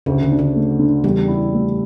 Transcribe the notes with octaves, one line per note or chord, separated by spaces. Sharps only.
D2 C#3
D3
D4
D3
A3
D3
E2 G3
E4
A3